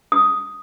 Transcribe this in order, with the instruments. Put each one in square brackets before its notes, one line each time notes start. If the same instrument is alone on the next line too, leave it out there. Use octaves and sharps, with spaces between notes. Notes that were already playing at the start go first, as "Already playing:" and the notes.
[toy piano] D#6